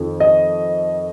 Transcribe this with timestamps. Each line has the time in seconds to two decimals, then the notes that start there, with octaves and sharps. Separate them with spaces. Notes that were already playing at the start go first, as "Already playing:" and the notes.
Already playing: F2 D#3
0.20 D#5